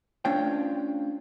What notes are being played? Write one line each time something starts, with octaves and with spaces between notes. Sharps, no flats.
A3 C#4 D4 F4 C5 G5